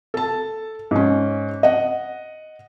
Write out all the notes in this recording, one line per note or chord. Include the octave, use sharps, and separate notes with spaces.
A4 A5
G#2 C#4
D#5 F#5